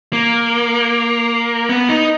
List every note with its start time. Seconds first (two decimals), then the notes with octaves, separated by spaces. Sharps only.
0.13 A#3
1.69 B3
1.89 D#4